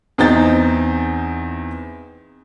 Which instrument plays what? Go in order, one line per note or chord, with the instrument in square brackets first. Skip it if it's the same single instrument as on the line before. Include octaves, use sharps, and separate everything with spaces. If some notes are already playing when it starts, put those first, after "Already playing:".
[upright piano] E2 C4 D#4 A6